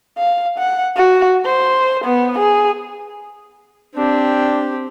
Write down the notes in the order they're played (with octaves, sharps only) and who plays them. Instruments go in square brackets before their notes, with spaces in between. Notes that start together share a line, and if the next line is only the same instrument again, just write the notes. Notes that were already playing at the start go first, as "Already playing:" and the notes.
[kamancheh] F5
F#5
F#4
C5
B3
G#4
[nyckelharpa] C4 G4 [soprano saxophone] D4